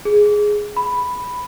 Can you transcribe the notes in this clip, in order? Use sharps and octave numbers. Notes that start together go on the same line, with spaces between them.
G#4
B5